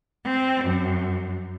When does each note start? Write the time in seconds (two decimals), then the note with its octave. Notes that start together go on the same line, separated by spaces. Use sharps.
0.23 C4
0.63 F#2